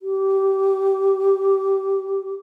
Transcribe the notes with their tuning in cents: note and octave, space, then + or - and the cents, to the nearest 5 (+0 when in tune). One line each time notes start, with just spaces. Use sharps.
G4 -20